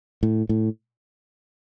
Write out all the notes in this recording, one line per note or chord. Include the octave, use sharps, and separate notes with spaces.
A2
A2